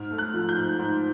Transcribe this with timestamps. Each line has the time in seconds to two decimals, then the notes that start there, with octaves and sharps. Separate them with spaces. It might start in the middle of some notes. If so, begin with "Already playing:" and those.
Already playing: G#2 F6
0.11 A3
0.18 F#6
0.34 F3
0.49 G6
0.56 G#2
0.79 G#2